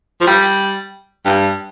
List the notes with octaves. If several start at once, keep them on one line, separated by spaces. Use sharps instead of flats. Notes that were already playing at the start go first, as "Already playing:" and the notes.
F3
G3
G2